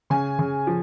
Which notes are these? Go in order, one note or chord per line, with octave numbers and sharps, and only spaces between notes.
C#3 G#5
C#3
F3